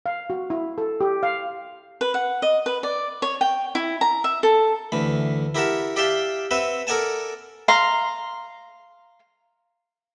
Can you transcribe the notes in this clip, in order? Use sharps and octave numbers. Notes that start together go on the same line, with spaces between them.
F5
F#4
E4
A4
G4
F5
B4
F#5
D#5
B4
D5
C#5
G5
E4
A#5
E5
A4
D2 E3 B5
E4 G4 A#4 F#5 A5
G4 D5 E5 F5 G5 A5
C4 B4 E5 F#5
A4 A#4 D5 F#5 G#5 A5
F5 A#5 C6